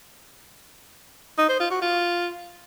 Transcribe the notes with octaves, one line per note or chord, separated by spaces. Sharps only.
D#4
C5
F4
F#4
F4